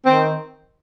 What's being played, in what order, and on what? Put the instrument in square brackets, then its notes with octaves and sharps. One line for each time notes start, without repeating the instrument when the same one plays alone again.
[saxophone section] D#3 C4